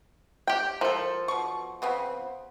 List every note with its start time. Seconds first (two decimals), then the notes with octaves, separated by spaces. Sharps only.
0.47 G4 G5
0.81 F3 A4 A#4
1.28 B2 C#6
1.82 C#3 B3 C4